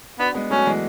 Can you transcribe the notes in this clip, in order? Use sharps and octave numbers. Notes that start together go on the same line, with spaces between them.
B3 D4 F#4
G#3 B3
F#3 A3 C#4
E3 G#3